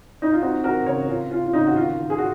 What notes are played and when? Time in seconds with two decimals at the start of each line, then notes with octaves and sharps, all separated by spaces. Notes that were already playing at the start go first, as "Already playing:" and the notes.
0.22 D#4
0.32 F4
0.41 C4 D#4 F#4
0.64 C4 F#4 A#4
0.86 C#3 A#4 C#5
1.08 C#4 F4
1.31 C#4 F4
1.45 F4
1.53 C#3 D#4
1.67 F#4
1.76 D#3 F4
1.99 D#3
2.10 G#4
2.18 F#4